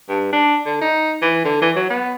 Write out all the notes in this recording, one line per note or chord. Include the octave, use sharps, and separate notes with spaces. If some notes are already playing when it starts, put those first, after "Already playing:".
G2
D4
D3
D#4
E3
D3
E3
F#3
B3